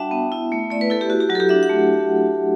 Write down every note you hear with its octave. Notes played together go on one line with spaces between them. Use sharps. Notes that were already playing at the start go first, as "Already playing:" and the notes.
Already playing: G3 D4 F#4 E5 F#5 G5 A5
B3
E4
A3
A3 D5
B4
E4 A4
G4
F#4
G4
F#3 F#4
A4
G4
D4 E5
F#5
A3